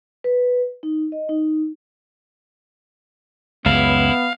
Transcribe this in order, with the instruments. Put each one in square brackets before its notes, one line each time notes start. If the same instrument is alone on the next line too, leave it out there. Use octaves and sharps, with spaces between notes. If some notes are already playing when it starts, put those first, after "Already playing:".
[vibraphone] B4
D#4
D#5
D#4
[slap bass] C#2 F#2 [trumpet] B3 [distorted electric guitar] E4 [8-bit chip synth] F5